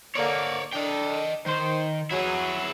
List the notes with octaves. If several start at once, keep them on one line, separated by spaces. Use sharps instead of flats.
D3 A#3 C#5 D5
D4 A4 D#5 G5
D#3 C5
F#3 E4 G#4